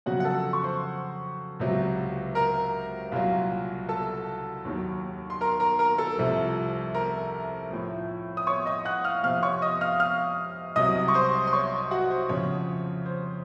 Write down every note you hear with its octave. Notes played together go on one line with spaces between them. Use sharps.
F2 C#3 F#3 F#4 F#5
F#5
A4 A5
C#6
C5 C6
C#2 C3 F#3
A#4 A#5
C2 A#2 F#3 F4 F5
A4 A5
D#2 D#3 F#3
C6
A#4 A#5
A#4 A#5
A#4 A#5
A4 A5
C2 C3 F3
A#4 A#5
A2 F3
D#6
C#5 C#6
D#5 D#6
F#5 F#6
F5 F6
F2 C3 F3 F5 F6
C#5 C#6
D#5 D#6
F5 F6
F5 F6
C2 C3 F#3 D#5 D#6
C#6
C5 C6
C6
C#5 C#6
F#4 F#5
C5
F2 C#3 F3 C#5
C5